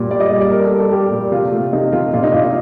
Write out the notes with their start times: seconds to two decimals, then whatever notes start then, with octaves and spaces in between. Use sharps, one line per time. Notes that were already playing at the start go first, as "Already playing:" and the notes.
Already playing: A#2 G3
0.10 G3 D5
0.20 D#5
0.30 G3 D5
0.41 D5
0.50 G3 A#4
0.64 A4
0.71 G3
0.78 A4
0.91 G3 G4
1.11 A#2
1.31 C3 F4
1.52 A3
1.73 C3 D#4
1.92 C3 F4
2.13 A#2 F4
2.23 D#4
2.33 A#2 F4
2.44 D#4